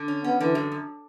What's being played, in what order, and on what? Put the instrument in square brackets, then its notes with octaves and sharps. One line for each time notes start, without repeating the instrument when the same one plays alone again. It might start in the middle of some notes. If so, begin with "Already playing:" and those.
Already playing: [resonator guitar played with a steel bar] D3
C#4
[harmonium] B3 [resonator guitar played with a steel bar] C#4
[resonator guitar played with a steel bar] D3 [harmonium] E3
[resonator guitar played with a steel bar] F#2
F#2